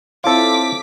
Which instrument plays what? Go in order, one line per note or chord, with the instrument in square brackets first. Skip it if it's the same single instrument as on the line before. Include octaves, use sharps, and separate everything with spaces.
[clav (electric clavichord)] C4 E4 C#5 [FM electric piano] F4 A4 [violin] D6 B6